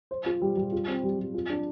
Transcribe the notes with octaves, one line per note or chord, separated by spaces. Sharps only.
C5
F4
G3
G3
F4
C4
G3
G3
F4
D4